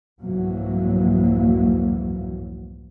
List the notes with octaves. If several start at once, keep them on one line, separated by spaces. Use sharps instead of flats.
F1 C2 G#2 E3 F#3 A#3